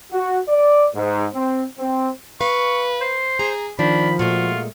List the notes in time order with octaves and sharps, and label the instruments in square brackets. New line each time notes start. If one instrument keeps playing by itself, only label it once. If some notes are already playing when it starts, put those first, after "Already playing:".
[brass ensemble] F#4
D5
G#2
C4
C4
[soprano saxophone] B4 [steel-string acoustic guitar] F5 [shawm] C#6
[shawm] C5
[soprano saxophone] G#4 [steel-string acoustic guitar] A#5
[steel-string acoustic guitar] D#3 [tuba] F3 [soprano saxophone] D4 [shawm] B5
[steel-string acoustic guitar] A#2 G#3 A3 [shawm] F4 [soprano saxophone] F#4